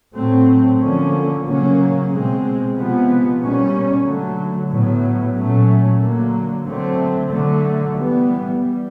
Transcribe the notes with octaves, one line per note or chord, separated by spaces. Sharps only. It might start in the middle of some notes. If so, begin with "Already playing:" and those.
A2 F#3 A3 C4
D3 F3 A#3 C#4
C#3 F#3 A#3 C#4
B2 G#3 C4
C3 F3 G#3 B3
B2 G3 A#3 C#4
D3 F#3 A3
A2 F#3 B3
A#2 F#3 A3 C#4
D3 F#3 A#3
D3 F#3 A3 C4
D3 F#3 A3
E3 G3 B3
G3